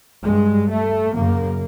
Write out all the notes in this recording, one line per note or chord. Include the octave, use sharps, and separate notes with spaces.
G2 G#3
A3
F#2 C#3 A#3